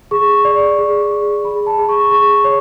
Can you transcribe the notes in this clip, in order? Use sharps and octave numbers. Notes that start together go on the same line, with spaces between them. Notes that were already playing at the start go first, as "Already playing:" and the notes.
G#4 C#6
D5
G#4
G#4
G#4 B5
A5
G#4 B5
C#6
G#4 C#6
C#5